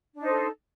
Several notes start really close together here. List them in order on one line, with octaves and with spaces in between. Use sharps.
D4 D#4 C5 A4